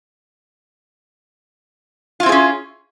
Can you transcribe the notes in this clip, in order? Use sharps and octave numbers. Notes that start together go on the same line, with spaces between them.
C4 C#4 E4 F4 G#4